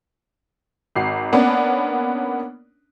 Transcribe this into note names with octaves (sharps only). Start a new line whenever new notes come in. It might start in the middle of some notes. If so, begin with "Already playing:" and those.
G#1 F#4 C7
A#3 B3 C#4 D4